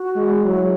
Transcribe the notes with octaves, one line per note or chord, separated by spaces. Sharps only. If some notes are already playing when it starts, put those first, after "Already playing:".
Already playing: F#4
G#3
F#3 E4